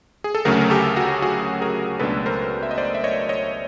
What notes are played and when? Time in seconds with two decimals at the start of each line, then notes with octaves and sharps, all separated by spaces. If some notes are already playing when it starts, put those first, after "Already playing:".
0.24 G#4
0.35 A4
0.45 D2 C#3 F#3 A3 C#4 G#4 A#4
0.61 A#4
0.70 G4 A4
0.96 F#4 G#4
1.22 F#4 G#4
1.62 G#4 A#4
1.99 C#2 B2 F#3 A3 D4 A4 B4
2.26 A#4 C5
2.63 E5
2.71 D#5
2.78 C5 D5
2.95 E5
3.04 C#5 D#5
3.29 C#5 D#5